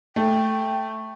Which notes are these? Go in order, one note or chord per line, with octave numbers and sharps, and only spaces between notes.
A3 G5